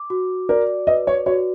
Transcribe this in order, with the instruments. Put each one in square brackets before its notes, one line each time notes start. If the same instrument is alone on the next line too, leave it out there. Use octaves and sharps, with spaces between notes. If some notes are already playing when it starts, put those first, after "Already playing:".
Already playing: [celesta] D6
F#4
[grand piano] A#4 [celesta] D5
[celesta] B4 [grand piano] D#5
[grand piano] C#5
[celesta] F#4 [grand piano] C#5